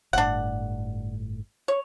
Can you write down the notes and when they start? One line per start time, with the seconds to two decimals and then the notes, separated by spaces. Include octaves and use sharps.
0.13 G1 A2 D4 F#5
1.68 C#5